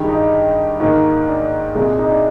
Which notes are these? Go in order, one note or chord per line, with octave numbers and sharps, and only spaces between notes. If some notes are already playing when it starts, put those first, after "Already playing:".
Already playing: G2 D#3 G#3 G4
D#4
G#2 D#3 A#3
D4
C2 A#2 G#3
D#4
D4